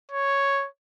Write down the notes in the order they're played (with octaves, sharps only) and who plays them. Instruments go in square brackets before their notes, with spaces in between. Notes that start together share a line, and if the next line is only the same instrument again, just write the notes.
[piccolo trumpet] C#5